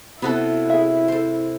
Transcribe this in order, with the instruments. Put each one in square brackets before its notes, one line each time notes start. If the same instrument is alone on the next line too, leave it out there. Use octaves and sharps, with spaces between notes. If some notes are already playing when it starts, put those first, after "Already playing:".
[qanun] C3 [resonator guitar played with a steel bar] B3 F#4 A4 [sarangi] E4
[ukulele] G#4 E5
[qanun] A4 C5